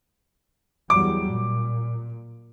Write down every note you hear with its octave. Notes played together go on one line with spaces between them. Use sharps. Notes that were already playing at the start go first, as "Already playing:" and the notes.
E2 F#3 G3 D6
A#2